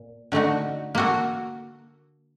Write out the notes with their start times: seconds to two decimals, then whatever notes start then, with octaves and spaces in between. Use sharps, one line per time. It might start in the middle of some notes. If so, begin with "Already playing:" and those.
Already playing: A#2
0.32 D3 A3 D#4 F#4
0.95 A#3 F#4 A4